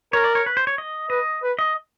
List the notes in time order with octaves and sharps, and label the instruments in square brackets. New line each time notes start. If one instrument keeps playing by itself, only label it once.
[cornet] A#4 [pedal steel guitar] C#5
[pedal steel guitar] D5
C#5
B4
C5
C#5
D#5
[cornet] B4 [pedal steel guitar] D#5
[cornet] B4
[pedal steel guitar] D#5